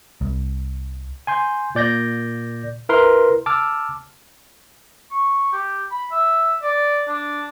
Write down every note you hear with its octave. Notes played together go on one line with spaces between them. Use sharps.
C2
G#5 C6 G6
A#2 D5 G6 A#6
E4 A#4 B4 C6
A5 D6 E6 F6
C#6
G4
B5
E5
D5
D4